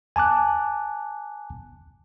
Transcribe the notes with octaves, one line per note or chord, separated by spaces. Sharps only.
G#5 A5 D6 F#6